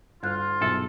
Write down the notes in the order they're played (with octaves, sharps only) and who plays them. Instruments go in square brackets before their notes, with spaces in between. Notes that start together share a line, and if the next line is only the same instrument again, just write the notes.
[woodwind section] D2 E4 F4 [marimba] G2 G3 F#6
[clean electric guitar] B1 A4 [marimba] G2 A#2 E5